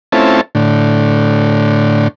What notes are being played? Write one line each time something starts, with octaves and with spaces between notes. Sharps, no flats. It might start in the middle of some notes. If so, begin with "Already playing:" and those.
A3 C4 C#4 E4 F4 A5
A2 D3